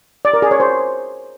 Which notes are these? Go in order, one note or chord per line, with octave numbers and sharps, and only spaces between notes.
D5
A#4
G#4
C#5
C5